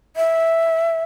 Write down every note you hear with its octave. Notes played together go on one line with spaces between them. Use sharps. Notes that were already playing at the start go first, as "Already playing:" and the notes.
E5